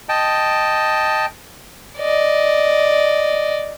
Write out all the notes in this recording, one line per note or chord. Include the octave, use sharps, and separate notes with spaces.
D#5 G5 A5
D5 D#5